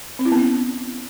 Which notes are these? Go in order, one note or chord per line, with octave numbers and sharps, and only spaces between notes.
C4
E4
B3
C#4